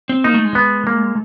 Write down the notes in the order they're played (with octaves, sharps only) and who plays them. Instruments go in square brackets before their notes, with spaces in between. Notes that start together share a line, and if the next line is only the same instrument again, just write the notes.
[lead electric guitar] C4
[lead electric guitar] A#3 [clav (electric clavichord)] D#4
[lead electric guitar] A3
G#3
[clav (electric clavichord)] B3
A#3